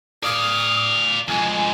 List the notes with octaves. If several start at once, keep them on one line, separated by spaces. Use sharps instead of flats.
D5 F5 D#6
F2 G#3 G#5